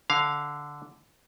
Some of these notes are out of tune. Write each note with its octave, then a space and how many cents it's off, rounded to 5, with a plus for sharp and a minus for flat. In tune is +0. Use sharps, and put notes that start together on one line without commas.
D3 -5 F5 +0